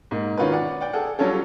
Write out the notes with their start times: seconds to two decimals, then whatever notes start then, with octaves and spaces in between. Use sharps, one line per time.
0.11 G#2 A#3
0.37 D#3 C#4 F4 F#4 A#4 B4
0.52 D5 F#5
0.81 D5 F#5 G5
0.93 G#4 A4 F#5
1.19 F#3 G3 C#4 F4 A4